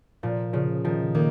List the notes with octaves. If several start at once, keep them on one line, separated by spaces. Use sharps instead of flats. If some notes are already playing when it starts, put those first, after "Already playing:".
A#2 F3
C#3 F3
D#3 F3
D#3 A#3